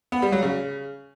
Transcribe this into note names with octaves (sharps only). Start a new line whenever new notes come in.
B3
G3
F#3
C#3